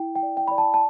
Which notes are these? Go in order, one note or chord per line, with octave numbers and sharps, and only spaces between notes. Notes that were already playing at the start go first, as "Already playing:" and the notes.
Already playing: E4 G5
G5
D5
G5
D5 B5
A5
A5